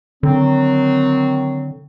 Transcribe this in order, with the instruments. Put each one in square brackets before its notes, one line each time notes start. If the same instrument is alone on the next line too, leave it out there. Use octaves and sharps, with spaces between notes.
[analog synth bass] D3 [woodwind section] D#3 F#3 C4